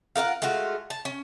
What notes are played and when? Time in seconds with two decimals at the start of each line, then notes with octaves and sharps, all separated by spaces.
0.16 F4 A#4 E5 F#5
0.42 G#3 A3 F4 F#4
0.90 A5
1.05 C#4